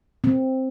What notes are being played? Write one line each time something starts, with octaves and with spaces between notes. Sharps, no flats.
C4